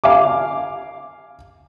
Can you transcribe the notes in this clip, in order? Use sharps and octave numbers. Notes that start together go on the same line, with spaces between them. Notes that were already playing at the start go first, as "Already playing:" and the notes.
F5 G#5 D6